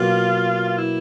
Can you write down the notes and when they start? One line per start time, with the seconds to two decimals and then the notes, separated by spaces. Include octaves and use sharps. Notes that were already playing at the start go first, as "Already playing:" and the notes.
Already playing: B2 F#3 A#3 F4
0.68 F4
0.78 E4